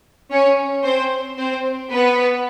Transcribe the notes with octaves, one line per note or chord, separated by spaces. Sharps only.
C#4 C#5
C4 C5
C4 C5
B3 B4